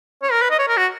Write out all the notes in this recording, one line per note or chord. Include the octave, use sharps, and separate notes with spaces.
C#5
A#4
B4
D#5
C#5
A#4
F#4